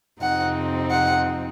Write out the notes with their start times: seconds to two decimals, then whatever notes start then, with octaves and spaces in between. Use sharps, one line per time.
0.20 F2 C3 F3 C4 D#4 F#5
0.90 F#5